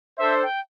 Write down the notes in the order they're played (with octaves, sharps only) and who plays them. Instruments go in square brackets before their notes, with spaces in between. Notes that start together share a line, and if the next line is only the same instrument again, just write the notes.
[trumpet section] D4 A4 C5 [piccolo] E5
[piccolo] G5